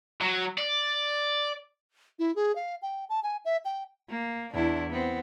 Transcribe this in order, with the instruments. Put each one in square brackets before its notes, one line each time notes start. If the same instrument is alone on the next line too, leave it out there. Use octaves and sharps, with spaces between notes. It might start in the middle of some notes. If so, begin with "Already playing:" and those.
[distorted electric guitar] F#3
D5
[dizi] E4
G#4
F5
G5
A5
G#5
E5
G5
[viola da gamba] A#3
E2 D4 E4
B3 C4